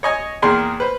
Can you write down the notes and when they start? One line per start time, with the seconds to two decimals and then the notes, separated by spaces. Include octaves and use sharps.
0.03 C#5 D#5 G#5
0.42 E2 D#3 A#3 G#4 C6
0.80 B4 C5